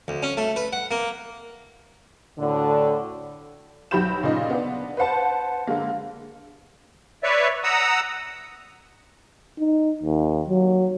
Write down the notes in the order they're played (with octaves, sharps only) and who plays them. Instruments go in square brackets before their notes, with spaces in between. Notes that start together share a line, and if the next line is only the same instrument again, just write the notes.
[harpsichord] D2
C#4
A3
B4
F#5
A#3
[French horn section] D2 A2 D3
[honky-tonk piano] B1 F#3 G4 B5 G6 E7
A#2 C#3 D#4 D#5
B3 D4
B4 C5 F#5 A5
D3 G#3 A#3
[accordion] B4 C#5 D5 E5
F#5 A#5 D#6 E6
[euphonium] D#4
D#2
F#3